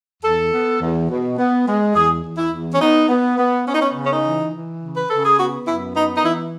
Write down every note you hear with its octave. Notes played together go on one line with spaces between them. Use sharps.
E2 A4
B3
E2
B2
B3
G#3
E2 G#4
E2
E4
E2
C#4
B3 D#4
B3
B3
B3 C#4
D#4
C#4
C#3
C#4
D#4
E3
E3
C#3
B4
C#3 A4
G#4
B3 F#4
F#2 E4
B3 D#4
D#4
E3 E4